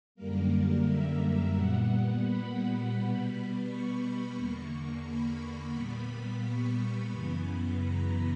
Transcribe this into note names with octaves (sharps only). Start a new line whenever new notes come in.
F#2 D3 G3 A#3 A#4
E5
A#2 G3 B3 F#5
B5
B2 G3 B3
C#6
E2 D3 A#3 C#6
B5
A#2 G3 B3
C#6
F#2 C#3 E3 B3 B5
A#5